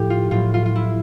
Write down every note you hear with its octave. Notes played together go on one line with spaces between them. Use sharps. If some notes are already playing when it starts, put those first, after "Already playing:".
Already playing: A2 F3 G4
F4
A2 F#3 F4
F4
F4
E4